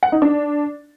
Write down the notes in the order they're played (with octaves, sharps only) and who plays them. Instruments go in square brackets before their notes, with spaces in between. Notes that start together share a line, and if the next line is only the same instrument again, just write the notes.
[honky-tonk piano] F#5
D#4
D4